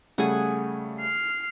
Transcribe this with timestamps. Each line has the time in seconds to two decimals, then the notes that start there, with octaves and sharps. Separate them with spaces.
0.18 C#3 G3 A3 G#4 F#5
1.00 F6 C7